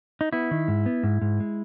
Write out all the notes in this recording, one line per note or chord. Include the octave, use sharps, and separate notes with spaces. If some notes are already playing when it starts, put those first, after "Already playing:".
D#4
B3 E4
D#3
G#2
B3
G#2
G#2
G#3